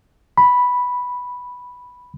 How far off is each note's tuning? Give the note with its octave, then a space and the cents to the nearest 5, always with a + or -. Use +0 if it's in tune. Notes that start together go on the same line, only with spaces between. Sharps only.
B5 -5